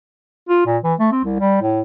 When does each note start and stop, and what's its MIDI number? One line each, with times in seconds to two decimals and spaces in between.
0.49 0.63 65
0.66 0.78 46
0.84 0.94 52
0.99 1.08 57
1.12 1.19 60
1.24 1.36 36
1.40 1.62 55
1.62 1.82 45